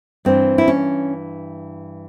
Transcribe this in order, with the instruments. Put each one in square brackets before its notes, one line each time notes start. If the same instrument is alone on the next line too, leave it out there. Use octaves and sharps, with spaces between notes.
[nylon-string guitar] G2 E3 C4
E4
C#4